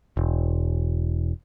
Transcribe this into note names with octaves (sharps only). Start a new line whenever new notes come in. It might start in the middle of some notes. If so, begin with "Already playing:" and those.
E1